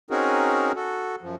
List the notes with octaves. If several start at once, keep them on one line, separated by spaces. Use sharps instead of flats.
C4 C#4 D#4 F#4 G#4 A#4
F#4 A4
F#2 F3